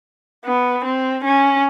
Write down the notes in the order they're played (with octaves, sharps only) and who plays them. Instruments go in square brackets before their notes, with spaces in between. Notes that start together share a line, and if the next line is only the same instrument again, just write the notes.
[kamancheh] B3
C4
C#4